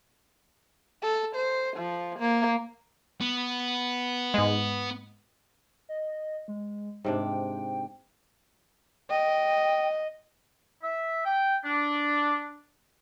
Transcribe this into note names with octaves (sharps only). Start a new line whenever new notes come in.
A4
C5
F3
A#3
B3
G#2 G#3
D#5
G#3
G#2 C3 D4 G5
D#5 G5
E5
G5
D4